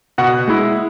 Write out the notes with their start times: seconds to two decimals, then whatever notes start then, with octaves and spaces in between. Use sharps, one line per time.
0.18 B2 F#5
0.47 G#3 E4